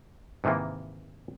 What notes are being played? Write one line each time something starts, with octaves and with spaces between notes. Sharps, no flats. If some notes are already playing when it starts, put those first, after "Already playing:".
G#2 C3 D#3 E3 A#3